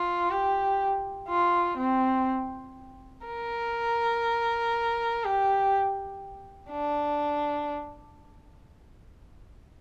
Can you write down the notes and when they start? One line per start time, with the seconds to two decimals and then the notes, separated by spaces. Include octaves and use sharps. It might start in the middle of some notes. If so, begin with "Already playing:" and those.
Already playing: F4
0.31 G4
1.28 F4
1.77 C4
3.26 A#4
5.24 G4
6.71 D4